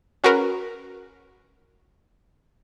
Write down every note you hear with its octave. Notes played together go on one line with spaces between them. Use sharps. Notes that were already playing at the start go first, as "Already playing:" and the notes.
C#4 F#4 G#4 A#4 B4